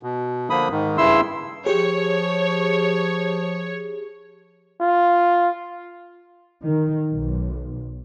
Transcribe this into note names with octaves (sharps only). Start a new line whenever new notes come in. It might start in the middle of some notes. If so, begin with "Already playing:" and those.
B2
D3 F3 A#3 B5 D#6
G#2 D#3
G2 C#3 E4 C6 E6
F3 G4 G#4 C#5
F4
D#3
B1